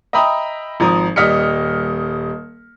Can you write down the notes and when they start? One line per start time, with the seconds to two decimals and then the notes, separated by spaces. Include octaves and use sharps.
0.13 D#5 E5 G5 A#5 B5 D#6
0.80 G#1 F3 A#5 D#6
1.16 D#1 G3 D#5 F6 B6 C#7